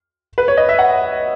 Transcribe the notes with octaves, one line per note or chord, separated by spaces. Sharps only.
B4
C#5
D#5
E5
F#5